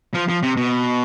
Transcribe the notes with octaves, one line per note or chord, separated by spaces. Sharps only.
F3
F3
C3
B2